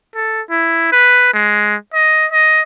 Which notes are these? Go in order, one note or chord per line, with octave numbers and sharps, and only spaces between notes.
A4
E4
B4
G#3
D#5
D#5